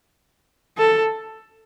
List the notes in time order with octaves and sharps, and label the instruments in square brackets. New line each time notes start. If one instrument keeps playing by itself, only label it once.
[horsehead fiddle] A4